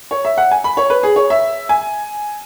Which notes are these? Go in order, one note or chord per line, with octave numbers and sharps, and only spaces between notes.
C#5
E5
F#5
G#5
B5
C#5
B4
G#4
C#5
E5
G#5